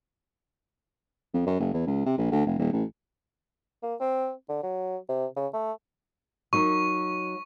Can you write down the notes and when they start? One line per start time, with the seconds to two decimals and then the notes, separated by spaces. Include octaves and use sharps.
1.34 F2
1.46 F#2
1.60 F#1
1.73 E2
1.87 C#2
2.06 C3
2.18 A#1
2.32 D2
2.46 F1
2.59 D#1
2.72 A1
3.82 A#3
4.00 C4
4.49 D3
4.63 F#3
5.08 C3
5.36 C#3
5.53 A3
6.53 F#3 D#4 A#4 C#6